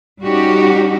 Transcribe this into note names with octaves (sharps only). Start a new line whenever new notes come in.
G3 C#4 D#4 F#4 G4